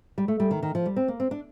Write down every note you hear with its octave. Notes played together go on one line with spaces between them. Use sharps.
G3
A3
G3
D#3
D#3
F3
G3
C4
A#3
C4
D4